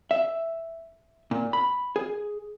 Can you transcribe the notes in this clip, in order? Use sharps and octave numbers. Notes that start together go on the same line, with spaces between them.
E5
A#2
B5
G#4